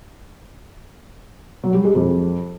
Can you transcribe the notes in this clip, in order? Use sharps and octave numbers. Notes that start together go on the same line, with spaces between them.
F#3
G3
G#3
F2